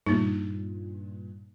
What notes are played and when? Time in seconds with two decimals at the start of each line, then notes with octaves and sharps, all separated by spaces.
0.06 G2 A#2 A#3 D#4